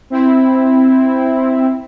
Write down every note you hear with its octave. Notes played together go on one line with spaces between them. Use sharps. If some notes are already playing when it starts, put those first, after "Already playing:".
C4 E4